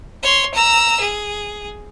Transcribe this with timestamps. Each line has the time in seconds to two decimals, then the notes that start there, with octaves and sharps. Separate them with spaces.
0.23 C#5 C6
0.54 A#5 E6
1.00 G#4